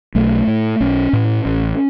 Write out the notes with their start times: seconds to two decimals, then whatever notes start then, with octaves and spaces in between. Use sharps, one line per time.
0.15 B1 A3
0.47 A2
0.80 B1 C#4
1.13 A2
1.46 A1